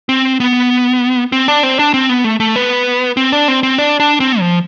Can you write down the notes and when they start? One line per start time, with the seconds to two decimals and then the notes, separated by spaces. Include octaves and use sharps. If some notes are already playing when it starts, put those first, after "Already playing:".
0.09 C4
0.40 B3
1.32 C4
1.48 D4
1.63 C4
1.79 D4
1.94 C4
2.09 B3
2.24 A3
2.40 A3
2.56 B3
3.17 C4
3.32 D4
3.48 C4
3.63 C4
3.78 D4
4.00 D4
4.20 C4
4.40 F3